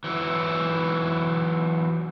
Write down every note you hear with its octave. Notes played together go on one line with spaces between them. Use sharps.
E3 F#3 E4